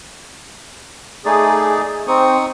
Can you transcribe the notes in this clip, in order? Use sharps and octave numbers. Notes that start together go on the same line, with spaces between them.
A3 D#4 G#4 D5
C4 D#4 C#6 D#6